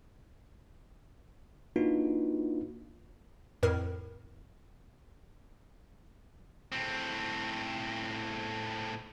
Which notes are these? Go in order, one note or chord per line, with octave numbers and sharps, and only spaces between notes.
A#3 D4 D#4 F4 F#4 B4
F2 A2 A#4
A2 C4